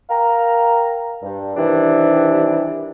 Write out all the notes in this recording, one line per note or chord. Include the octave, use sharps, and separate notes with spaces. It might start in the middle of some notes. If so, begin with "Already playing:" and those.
A#4 F5 G5 A#5
G2
C3 D#3 E3 G3 C4 D4